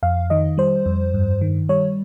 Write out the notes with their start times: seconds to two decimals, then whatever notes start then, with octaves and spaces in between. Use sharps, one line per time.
0.03 F2 F5
0.30 D#3 D#5
0.58 G3 C5
0.86 F2
1.14 G2
1.41 D#3
1.69 G3 C#5